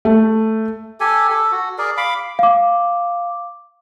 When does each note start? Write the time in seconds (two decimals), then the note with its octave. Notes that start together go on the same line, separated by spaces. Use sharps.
0.05 A3
1.00 G4 A4 G#5
1.30 A4
1.52 F#4
1.78 G#4 A#4 D5
1.97 F5 B5 D6
2.39 F5 D6